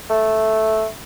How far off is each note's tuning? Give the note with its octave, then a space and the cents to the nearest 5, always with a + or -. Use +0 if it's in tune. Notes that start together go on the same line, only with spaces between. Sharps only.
A3 -5